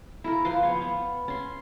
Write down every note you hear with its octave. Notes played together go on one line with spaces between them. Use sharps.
E4 A4 A#4
F3 B4 C6 D6
B3 C#5 F5
B3
C#4 C6